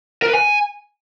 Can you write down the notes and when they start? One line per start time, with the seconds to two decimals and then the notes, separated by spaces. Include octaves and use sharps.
0.22 A#4
0.28 B4
0.34 G#5